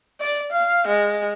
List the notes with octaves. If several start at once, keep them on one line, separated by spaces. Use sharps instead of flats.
D5
F5
G#3